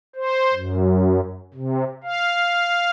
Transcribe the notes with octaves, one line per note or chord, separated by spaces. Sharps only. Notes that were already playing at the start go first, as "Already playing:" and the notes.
C5
F#2
C3
F5